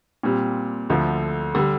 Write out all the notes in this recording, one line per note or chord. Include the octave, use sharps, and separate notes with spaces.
A#2 G3 C4
D2 D3 F3
D3 G3